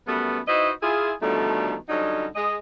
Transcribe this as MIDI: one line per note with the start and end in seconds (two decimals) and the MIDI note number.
0.07 0.40 42
0.07 0.40 55
0.07 0.40 57
0.07 0.40 59
0.48 0.71 63
0.48 0.71 64
0.48 0.71 66
0.48 0.71 71
0.48 0.71 72
0.48 0.71 75
0.82 1.12 64
0.82 1.12 65
0.82 1.12 68
1.22 1.75 47
1.22 1.75 50
1.22 1.75 51
1.22 1.75 53
1.22 1.75 55
1.22 1.75 57
1.89 2.26 50
1.89 2.26 54
1.89 2.26 55
1.89 2.26 61
1.89 2.26 63
2.35 2.56 56
2.35 2.56 75